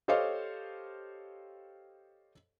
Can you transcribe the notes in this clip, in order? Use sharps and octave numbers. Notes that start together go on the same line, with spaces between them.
G4 A4 C5 C#5 D#5 F5